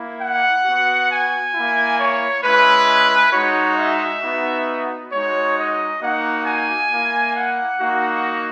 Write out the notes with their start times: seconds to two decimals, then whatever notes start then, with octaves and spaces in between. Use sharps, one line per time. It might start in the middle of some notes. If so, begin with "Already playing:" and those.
Already playing: A#3 E4
0.20 F#5
0.65 B3 F#4
1.10 G#5
1.55 A#3 E4
1.99 C#5
2.44 G#3 C#4 E4 B4
3.33 G#3 D#4 F#4 C#5
3.78 E5
4.23 B3 D#4 F#4
5.12 G#3 D#4 F#4 C#5
5.57 D#5
6.02 A#3 D#4 F#4 F#5
6.46 G#5
6.91 A#3 E4
7.36 F#5
7.81 A#3 D#4 F#4